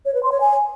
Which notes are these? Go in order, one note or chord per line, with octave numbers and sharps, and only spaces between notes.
C#5
B4
C6
C#5
G#5